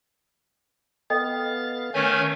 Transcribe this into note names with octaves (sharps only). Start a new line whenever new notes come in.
B3 A4 D#5 F5 G5 A6
D#3 A3 C#4 C#5 G#5 A5 G6 G#6